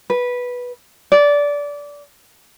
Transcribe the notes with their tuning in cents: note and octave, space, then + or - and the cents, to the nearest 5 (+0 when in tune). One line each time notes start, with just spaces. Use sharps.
B4 -10
D5 -20